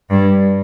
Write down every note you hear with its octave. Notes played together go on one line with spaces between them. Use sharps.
G2